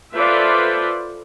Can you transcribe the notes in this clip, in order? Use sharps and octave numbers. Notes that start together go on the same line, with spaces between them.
F4 A4 B4 C5 D5 E5